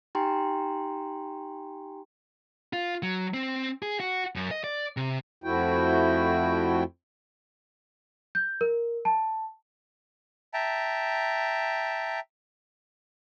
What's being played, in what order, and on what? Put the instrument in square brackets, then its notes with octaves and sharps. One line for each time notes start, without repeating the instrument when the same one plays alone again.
[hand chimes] D#4 G4 G5 G#5 A#5 C6
[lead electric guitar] F4
F#3
C4
G#4
F#4
F#2
D#5
D5
C3
[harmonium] F2 F3 A3 E4 F#4 G5
[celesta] G6
A#4
A5
[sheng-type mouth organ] E5 G5 A5 A#5